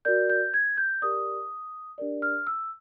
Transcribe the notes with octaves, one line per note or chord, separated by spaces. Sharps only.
F#4 A#4 D5 G6
G6
G#6
G6
G4 A#4 D5 D#6
D4 G4 A#4 D5
F6
E6